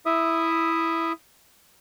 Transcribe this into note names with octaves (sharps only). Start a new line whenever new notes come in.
E4 E5 D#6